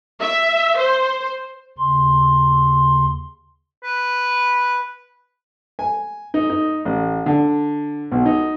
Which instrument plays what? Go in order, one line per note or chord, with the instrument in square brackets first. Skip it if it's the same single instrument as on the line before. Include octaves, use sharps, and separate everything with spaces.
[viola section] E5
C5
[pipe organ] D#2 C#3 C6
[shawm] B4
[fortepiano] G#5
D#4
D#4
A1
D3
B1
D#4